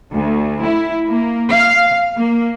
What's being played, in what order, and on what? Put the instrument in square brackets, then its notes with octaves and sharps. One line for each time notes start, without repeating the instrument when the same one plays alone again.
[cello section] D2
E4
A#3
F5
A#3